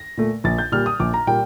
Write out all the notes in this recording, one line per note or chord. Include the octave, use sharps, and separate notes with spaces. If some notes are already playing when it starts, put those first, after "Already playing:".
Already playing: A#6
A#2 A3
A#1 A6
G6
A#2 G3 F6
D#6
A#1 D6
A#5
A#2 G3 A#3 G5